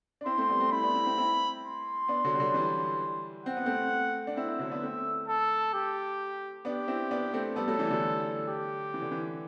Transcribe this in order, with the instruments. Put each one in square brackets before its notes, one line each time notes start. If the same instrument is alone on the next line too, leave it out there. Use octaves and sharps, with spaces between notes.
[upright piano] D4
[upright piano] C4 E4 [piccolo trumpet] C6
[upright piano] A3 C4
G3 B3
A3 C4
[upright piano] C4 E4 [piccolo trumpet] B5
[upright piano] B3 D4
C4 E4
C4 E4
C4 E4
[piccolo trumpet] C6
[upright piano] B3 D4
D3 F#3
G3
D3 F#3
E3 G3
[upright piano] C4 [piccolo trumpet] F#5
[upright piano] B3
A3 C4
D4
[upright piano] C4 E4 [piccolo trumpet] E5
[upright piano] C4 E4
D3 F#3
B3 D4
A3 C4
[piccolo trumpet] A4
G4
[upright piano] B3 D4 [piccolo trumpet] G4
[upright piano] C4 E4
B3 D4
A3 C4
[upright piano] G3 B3 [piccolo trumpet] A4
[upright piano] F#3 A3
E3 G3
D3 F#3
[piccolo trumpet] G4
[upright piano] E3
D3
E3